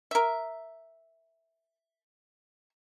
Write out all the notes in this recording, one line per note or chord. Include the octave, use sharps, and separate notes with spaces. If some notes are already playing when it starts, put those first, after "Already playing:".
A#4 E5